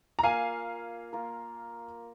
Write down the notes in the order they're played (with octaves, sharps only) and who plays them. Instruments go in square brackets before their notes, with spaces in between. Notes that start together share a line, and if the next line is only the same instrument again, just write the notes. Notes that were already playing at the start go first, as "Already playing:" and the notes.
[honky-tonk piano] A#5
[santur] A#3 F4 A#4 [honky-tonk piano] F5 G#5
[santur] A#3 F4 A#4